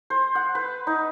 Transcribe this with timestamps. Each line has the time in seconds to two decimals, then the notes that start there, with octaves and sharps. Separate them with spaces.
0.10 C5
0.35 F#5
0.55 B4
0.87 D#4